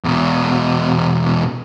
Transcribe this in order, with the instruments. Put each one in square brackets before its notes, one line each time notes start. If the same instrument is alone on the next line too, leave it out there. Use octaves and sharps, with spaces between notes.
[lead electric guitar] E2 B2